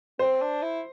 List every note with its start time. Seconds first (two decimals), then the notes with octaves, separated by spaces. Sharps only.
0.19 C4 C5
0.41 D4
0.62 E4